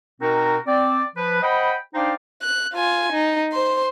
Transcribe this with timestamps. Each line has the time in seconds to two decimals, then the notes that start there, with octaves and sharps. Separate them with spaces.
0.21 B2 C4 D#4 F#4 A#4
0.67 C4 D5
1.16 F3 B4
1.43 C5 D#5 F#5 G5 B5
1.94 D4 D#4 C5 D5 F5 G5
2.42 F#6
2.74 F4 G#5
3.12 D#4
3.52 C5 C6